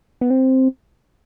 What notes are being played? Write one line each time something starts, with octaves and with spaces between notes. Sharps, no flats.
B3
C4